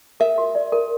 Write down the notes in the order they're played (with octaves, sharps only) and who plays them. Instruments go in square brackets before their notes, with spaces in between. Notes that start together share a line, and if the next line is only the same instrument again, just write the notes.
[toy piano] A#4 [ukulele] E5
[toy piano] F#4
D5
A#4